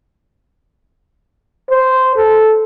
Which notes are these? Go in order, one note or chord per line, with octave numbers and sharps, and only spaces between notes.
C5
A4